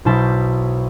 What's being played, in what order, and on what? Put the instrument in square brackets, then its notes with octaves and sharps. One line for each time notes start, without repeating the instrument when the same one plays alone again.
[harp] B1 B2 E4 C5 A5 B6